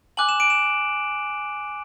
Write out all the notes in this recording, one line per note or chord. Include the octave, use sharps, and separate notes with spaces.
G#5 D6 F#6 F#7
E7
D7
E7